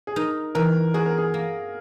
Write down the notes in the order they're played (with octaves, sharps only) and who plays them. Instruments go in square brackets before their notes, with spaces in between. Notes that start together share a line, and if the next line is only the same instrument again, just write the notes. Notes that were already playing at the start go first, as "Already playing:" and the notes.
[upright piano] G#4
[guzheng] D#4 [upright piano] A#4
[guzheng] E3 [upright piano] A#4
[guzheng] F#4 [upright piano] G#4
[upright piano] A#4
G#4
[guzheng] A#3